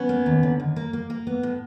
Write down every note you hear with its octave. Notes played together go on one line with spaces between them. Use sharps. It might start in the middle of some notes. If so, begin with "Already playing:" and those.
Already playing: B3 C#4
A#3
D#2
D3
D#2
A#3
A#3
A#3
B3
A2